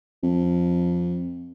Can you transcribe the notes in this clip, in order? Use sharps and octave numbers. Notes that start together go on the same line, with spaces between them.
F2